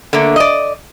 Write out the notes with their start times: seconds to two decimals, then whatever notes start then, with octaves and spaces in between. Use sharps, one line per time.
0.13 D3 A3 A#3
0.36 D5 D#5